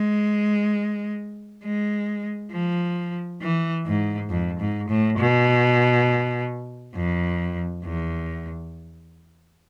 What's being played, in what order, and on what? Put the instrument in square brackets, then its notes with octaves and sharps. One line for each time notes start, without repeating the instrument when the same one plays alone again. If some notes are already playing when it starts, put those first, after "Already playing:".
Already playing: [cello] G#3
G#3
F3
E3
G#2
F2
G#2
A2
B2
F2
E2